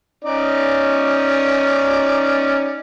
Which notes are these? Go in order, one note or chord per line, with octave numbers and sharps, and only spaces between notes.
C#4 D#4 D5